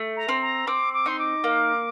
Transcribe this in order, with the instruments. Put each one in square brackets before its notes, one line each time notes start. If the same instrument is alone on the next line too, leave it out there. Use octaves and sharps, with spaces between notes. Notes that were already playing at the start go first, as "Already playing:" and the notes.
Already playing: [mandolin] A3
[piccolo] A#5
[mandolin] C4
[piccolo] A#5
[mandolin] C4 [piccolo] D6
[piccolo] D6
[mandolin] D#4 [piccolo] C6
[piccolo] D6
[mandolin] A#3